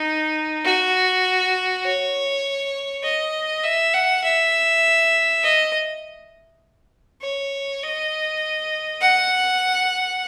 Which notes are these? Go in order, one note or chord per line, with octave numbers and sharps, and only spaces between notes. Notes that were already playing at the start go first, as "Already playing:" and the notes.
Already playing: D#4
F#4
C#5
D#5
E5
F#5
E5
D#5
C#5
D#5
F#5